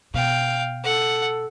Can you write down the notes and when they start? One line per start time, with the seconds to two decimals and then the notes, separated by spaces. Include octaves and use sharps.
0.14 B2 F5 G5
0.84 A4 F#5